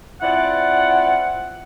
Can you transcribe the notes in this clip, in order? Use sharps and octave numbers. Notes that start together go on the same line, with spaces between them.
C4 E4 F4 D5 F#5